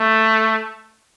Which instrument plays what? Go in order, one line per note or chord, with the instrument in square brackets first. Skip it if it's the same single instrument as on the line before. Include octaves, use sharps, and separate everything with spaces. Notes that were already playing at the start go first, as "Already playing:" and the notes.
Already playing: [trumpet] A3